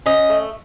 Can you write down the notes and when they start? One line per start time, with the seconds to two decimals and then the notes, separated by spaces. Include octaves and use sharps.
0.06 C#4 D#5
0.30 A3